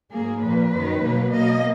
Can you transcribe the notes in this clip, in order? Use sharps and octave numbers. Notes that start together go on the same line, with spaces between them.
G#2 F#3 A#3 G#4
A#2 F3 A#3 B4
F#2 D#3 F#3
B2 F#3 A#3
B2 A#3 D#5